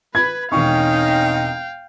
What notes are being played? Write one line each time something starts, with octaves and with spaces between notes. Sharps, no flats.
B4 B5 G#6
E1 C4 C#4 D#4 F5 G5 C#6